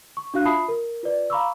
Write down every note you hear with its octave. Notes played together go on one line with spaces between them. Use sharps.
C#6
D4 F#4 F5 F#6
F4 E5 A5 B5 D#6 C7
A#4
F4 B4 D5
F5 A#5 B5 C#6 D6 E6